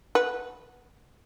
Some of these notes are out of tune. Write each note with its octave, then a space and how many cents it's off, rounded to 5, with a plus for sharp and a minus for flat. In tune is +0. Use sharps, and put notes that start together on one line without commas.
B4 +0 F#5 +0